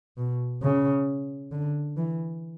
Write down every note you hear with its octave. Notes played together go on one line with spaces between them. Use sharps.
B2
C#3
D3
E3